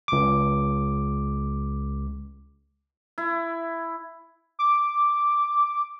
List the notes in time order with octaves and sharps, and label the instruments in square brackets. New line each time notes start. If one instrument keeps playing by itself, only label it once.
[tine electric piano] C#2 D6
[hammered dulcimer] E4
[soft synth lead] D6